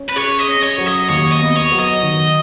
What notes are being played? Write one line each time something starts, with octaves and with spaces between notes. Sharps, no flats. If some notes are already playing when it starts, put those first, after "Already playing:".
Already playing: C#4
B4
G#4 C#5
D#5
C#4
C#5
F#3
D#5
D#2 C#5
D#5
B3
C#5
F#3
D#5
D#3